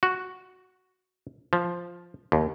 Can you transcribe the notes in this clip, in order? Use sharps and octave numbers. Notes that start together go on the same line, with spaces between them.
F#4
F3
D#2